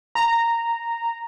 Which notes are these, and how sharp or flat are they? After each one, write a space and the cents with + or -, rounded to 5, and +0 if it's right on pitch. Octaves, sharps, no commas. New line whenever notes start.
A#5 -10